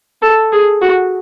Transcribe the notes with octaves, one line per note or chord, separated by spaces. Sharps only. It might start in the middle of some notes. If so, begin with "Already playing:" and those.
A4
G#4
F#4